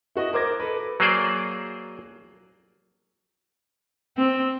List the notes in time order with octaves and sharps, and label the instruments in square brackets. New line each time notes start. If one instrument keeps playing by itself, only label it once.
[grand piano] E4 F#4 D#5
A#4 C5 D6 G#6 A#6
A4 B4
[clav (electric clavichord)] F#3 A#3 G#4 C5 D5
[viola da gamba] C4